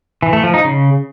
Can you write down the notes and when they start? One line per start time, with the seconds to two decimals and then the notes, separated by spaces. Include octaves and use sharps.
0.23 E3
0.33 A3
0.43 F3
0.54 D#4
0.64 C#3